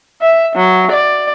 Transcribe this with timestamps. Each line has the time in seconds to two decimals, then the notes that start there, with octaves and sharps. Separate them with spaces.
0.22 E5
0.56 F#3
0.91 D5